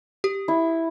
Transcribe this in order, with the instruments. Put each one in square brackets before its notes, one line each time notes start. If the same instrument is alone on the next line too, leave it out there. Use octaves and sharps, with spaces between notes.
[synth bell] G4
[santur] E4